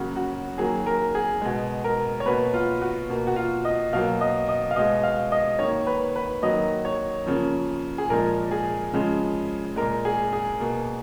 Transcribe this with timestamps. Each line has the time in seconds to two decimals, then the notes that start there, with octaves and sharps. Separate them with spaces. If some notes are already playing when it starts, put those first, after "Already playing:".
Already playing: C#3 F#3 A#3 F#4
0.16 F#4
0.58 D#3 F#3 A#3 G#4
0.86 A#4
1.15 G#4
1.42 B2 G#3
1.84 A#4
2.20 C#5
2.25 B2 A#3 B4
2.53 F4
2.82 F#4
3.10 B2 A#3
3.27 F#4
3.36 F4
3.65 D#5
3.93 B2 F#3 A#3 F5
4.21 D#5
4.48 D#5
4.71 F5
4.76 B2 G#3 D#5
5.03 F5
5.32 D#5
5.59 D#3 A#3 C#5
5.87 B4
6.16 B4
6.43 D#3 F#3 A#3 D#5
6.85 C#5
7.27 C#3 F3 A#3
7.98 G#4
8.09 A#2 F3 G#3 A#4
8.51 G#4
8.93 C#3 F3 G#3
9.76 A#2 G#3 A#4
10.05 G#4
10.33 G#4
10.60 B2 A#3